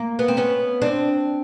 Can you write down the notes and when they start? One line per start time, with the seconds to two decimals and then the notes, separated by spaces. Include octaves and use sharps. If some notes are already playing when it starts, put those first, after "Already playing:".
Already playing: A#3
0.19 B3
0.28 C4
0.37 B3 C#4
0.82 C4 D4